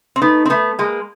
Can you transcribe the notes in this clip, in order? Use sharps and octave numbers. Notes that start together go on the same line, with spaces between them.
C4
A3 B3 D#4
C4
A3 B3
G#3 A#3